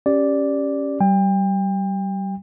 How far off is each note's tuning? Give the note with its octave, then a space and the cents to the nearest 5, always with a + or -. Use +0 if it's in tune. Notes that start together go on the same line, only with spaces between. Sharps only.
C#4 +0 G4 +0 D5 -5
G3 -30 G5 +35